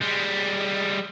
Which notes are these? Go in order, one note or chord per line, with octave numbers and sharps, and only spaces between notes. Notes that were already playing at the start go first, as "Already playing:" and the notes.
G3 G#3